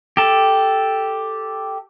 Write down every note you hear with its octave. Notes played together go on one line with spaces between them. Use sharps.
G4 A4